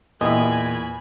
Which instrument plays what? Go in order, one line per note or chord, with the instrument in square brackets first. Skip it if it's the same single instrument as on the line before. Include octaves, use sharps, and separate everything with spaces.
[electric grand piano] E2 [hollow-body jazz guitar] A#2 A#3 [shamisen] E4 G4 D#5 [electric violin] G#5 B5